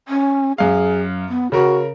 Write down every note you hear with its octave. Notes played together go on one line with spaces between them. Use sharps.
C#4
F#2 G#4 F5
B3
C#3 F#4 A#4